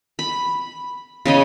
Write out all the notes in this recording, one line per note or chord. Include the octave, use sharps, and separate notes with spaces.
B5
C#3 C#5 D#5 B5